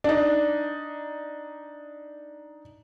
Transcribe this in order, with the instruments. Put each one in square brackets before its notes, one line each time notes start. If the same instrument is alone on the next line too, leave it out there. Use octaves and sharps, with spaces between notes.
[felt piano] D4 D#4